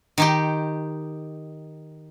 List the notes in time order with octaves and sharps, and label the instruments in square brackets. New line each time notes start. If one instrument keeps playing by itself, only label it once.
[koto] D#3 D#4 G4